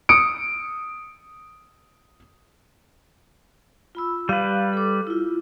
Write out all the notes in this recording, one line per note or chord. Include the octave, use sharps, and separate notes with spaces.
D#6 C#7 D7
F4 B5 E6
G3 B4 F5
A4 D6
E4 F4